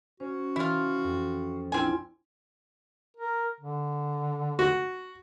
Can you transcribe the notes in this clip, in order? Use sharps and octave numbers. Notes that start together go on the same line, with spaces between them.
C#4 F#4 C5
E3 E4 F4 F6
F2
A#1 C4 D4 E4 F4 G#5
A#4
D3
F#4